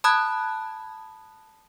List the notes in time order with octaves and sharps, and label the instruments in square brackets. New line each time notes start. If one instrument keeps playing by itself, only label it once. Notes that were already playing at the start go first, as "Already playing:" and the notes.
[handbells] A5 B5 D#6 F#6 G#6